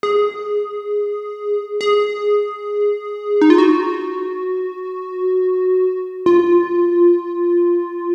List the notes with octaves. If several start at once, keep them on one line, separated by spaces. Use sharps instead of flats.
G#4
G#4
D#4
F4
F#4
F4